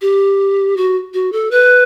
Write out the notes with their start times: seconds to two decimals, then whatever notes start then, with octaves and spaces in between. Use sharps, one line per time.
0.01 G4
0.77 F#4
1.14 F#4
1.32 A4
1.51 B4